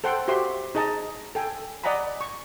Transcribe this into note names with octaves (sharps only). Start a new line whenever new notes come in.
A4 C5 F#5 G5 C6
F#4 G4 C5 E5 C6
D#4 G#4 D#5 A5 A#5
A4 G5 G#5
D5 D#5 F#5 G#5 A#5 B5
C#6